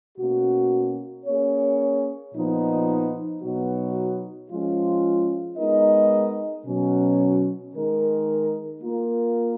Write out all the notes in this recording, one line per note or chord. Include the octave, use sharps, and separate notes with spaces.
B2 A#3 C#4 F#4
A#3 C#4 G#4 C#5
A#2 F3 B3 D#4
B2 F#3 B3 D#4 F#4
F3 G#3 C#4 F4
G#3 B3 D#4 A#4 D#5
B2 F#3 C#4
D#3 G#3 D#4 A#4
A#3 F4 A#4